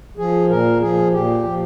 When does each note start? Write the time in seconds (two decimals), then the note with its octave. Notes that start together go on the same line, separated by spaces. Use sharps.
0.18 F3 G#4
0.49 A#2 A#4
0.80 F3 G#4
1.12 A#2 G4
1.44 F3